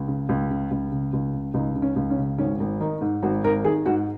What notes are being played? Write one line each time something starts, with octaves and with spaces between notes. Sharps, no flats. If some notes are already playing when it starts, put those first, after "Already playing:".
Already playing: C#2
C#3
C#2
C#3
C#2
C#3
C#2
C#3
C#2 D#4
C#3
C#4
C#2
C#4
C#3
G#1 C#4
G#1
D#3 D#4
G#2
G#1 F#4
G#1 A#4
D#3 G#4
G#2 F#4